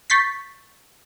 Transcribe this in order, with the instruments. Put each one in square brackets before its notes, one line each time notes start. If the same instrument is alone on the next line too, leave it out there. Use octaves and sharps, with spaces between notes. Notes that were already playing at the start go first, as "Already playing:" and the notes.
[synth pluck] C#6 G6 A6 B6 C7